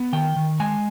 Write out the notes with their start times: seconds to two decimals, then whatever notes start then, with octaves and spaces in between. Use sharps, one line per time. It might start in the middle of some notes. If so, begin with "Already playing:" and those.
Already playing: B3
0.13 D#3 G5
0.36 D#3
0.60 G#3 G#5